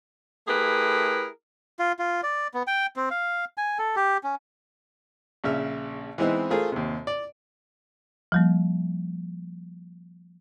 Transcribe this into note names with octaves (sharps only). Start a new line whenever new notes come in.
A3 E4 G4 G#4 A#4 B4
F4
F4
D5
B3
G5
C4
F5
G#5
A4
G4
C#4
A#1 C#3 E5 F6
E3 G#3 B3 C4 D#4 E4
A3 F4 G#4 A#4 C5
D#2 C3
D5
F3 G3 A#3